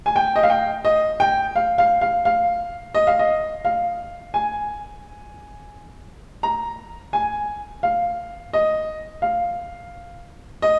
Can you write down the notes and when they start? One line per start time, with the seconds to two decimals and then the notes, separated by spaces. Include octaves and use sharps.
0.06 G#5
0.16 G5
0.36 D#5
0.43 F5
0.50 G5
0.85 D#5
1.20 G5
1.56 F5
1.78 F5
2.01 F5
2.25 F5
2.95 D#5
3.07 F5
3.19 D#5
3.65 F5
4.34 G#5
6.43 A#5
7.13 G#5
7.83 F5
8.53 D#5
9.22 F5
10.62 D#5